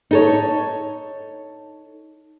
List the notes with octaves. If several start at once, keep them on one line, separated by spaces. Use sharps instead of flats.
D#4 A4 C#5